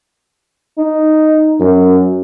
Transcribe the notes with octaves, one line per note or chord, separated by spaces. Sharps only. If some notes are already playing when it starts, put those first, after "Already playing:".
D#4
F#2